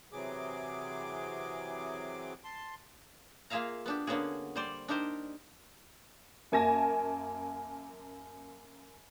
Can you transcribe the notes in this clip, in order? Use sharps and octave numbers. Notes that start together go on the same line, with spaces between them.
C3 E3 F#3 G#4 D6
A5 C6
A#3 F4 G#4 E5 F5 A#5
B3 D4 G4
D3 A#3 B3 C#4 F#4 G#4
G3 C5 D5
D4 D#4 G4 A#4 C5
F#2 A#3 G#5 A5 A#6